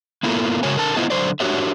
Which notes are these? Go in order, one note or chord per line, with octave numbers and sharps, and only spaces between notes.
A#3 B3 E4 F4 A4 A#4
C#3 G#3 F#4 A#4 C#5 G#5
D3 A#4 A5
A3 B3 E4 F4 C5 D#5
D3 F#3 F#4 C5 D5
D4 F#4 G4 A#4 C#5 E5